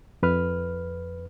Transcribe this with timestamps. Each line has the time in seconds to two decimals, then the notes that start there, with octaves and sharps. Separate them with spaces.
0.23 F2 B4 F6